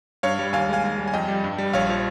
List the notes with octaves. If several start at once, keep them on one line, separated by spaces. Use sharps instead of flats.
G2 C#5 F5
G3
D#2 F5 G#5
G#3 F5 G#5
D#2
G3
G#5
F2 D#5 G5
G3
G2
G3
A#1 C#5 F5
F3